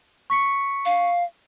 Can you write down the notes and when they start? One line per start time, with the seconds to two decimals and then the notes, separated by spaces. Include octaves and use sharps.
0.30 C#6 B6 C#7
0.85 F5